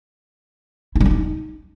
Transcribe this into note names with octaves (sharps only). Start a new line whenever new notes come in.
E4
G3
D4
D#4